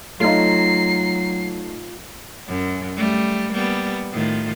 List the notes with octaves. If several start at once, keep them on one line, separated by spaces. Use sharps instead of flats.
F#3 A3 D#4 F4 C7
F#2
G3 A3
G3 A#3 B3
A2 D#3 F4